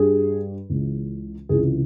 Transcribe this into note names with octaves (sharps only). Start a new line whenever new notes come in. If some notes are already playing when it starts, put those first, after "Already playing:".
Already playing: G2 G3 G#4
C#2 C#3 E3 G#3
C#2 C3 E3 G#4